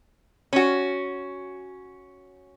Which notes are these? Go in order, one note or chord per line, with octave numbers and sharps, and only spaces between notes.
C#4 F#4